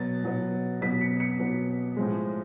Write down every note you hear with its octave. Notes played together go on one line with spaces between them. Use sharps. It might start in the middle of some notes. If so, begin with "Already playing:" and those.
Already playing: B2 F#3 B3 A6
B2 F#3 B3
B2 F#3 B3 B6
C#7
C#7
B2 F#3 B3
A2 F3 G#3